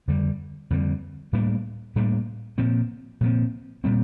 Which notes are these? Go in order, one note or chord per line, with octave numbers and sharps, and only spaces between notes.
F2 D3 G3
F2 D3 G3
A2 G3 A#3 D4
A2 G3 A#3 D4
A#2 F3 C4
A#2 F3 C4
A#2 G3 C4